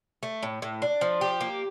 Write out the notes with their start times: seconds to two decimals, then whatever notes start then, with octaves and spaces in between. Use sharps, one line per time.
0.23 A3
0.43 A2
0.62 A2
0.82 D4
1.01 F3
1.21 G4
1.41 A#3